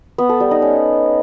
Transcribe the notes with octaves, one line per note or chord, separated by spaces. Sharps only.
B3
A4
G3
D#4
C#4